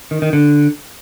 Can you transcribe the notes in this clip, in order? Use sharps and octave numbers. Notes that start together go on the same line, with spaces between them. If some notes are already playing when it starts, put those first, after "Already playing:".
D#3
D#3
D3